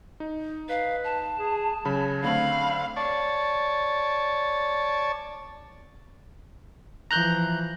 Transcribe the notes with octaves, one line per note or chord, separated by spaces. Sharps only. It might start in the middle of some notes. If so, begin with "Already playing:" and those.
D#4
B4 F5
A5
G#4
C#3 F#3 B5
D3 A3 C4 F5 B5
C#5 D5 A5
E3 F3 A#5 F#6 G6